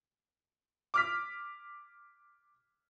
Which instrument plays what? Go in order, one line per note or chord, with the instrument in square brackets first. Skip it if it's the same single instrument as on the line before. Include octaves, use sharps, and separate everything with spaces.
[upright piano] D6 F6 B6